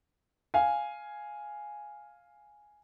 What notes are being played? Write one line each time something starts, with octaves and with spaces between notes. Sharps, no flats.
F5 G#5